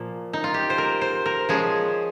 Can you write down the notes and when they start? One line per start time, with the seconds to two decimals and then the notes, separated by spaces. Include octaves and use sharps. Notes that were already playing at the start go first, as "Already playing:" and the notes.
Already playing: A#2 F3 A#3
0.33 D#4
0.44 F4
0.54 G4
0.70 C5
0.78 A#4
1.01 C5
1.26 A#4
1.49 F3 G#3 C#4 G#4